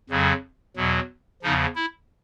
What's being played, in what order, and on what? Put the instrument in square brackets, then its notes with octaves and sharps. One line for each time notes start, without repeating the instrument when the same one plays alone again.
[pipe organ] F2 C#3 F#3
E2 B2 F#3
E2 C#3 F3 D#4
E4